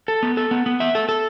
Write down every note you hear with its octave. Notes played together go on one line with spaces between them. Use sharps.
A4
B3
A4
B3
B3
E5
A4
A4